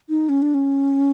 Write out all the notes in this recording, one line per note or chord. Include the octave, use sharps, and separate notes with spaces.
D#4
C#4
D4
C#4